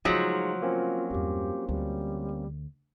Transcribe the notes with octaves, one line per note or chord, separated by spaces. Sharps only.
C#3 F3 F#3 G#3 A3 D#4 F4
A#3 C4 C#4 F4
E2 G2 G4
D2 G3